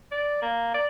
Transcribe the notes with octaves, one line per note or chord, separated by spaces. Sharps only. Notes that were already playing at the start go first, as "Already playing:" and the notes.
D5
A#3
D5